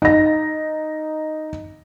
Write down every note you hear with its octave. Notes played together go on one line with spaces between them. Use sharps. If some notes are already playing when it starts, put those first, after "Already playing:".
D#4 A#6